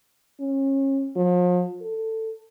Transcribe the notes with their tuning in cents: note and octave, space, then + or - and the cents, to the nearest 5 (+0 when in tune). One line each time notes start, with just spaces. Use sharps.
C#4 -30
F3 +40
A4 +15